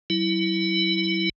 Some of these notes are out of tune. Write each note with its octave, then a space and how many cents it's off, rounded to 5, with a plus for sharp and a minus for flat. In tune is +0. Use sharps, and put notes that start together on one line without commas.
F#3 +35 E4 +0